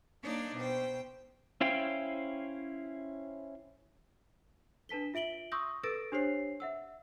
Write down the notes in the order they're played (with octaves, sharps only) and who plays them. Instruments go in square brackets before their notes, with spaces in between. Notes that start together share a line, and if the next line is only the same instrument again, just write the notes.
[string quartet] A#3 D4 D#4 C#5 D5
B2 C5 G5
[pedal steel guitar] C#4 E4 C5 F5 G5
[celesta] D4 B4 A5 B6 G7
F4 E5 D7 F#7 G7
C6 C#6 D#6 E6 G6 A#6
A4 B4 E6 A6 A#6 D7
D4 G4 C5 C#5 C7
E5 F#5 E6